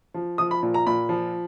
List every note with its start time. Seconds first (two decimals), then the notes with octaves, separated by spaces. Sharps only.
0.14 F3
0.38 F3 D#6
0.51 B5
0.63 A#2
0.74 A#5
0.86 A#2 B5
1.09 F3